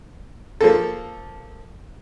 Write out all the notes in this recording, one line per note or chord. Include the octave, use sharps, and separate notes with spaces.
F3 A#3 A4